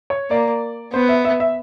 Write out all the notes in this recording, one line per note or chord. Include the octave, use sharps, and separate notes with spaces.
C#5
A#3 D5
B3 C5
E5
E5
E5